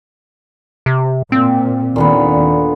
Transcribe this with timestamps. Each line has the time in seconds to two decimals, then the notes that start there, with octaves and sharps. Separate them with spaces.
0.86 C3
1.32 A#2 C4
1.96 D#2 A#2 D3 D#3 B3